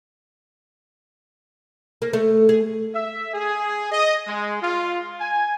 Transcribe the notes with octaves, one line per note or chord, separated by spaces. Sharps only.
A#3
A3
G#4
E5
G#4
D#5
G#3
F4
G#5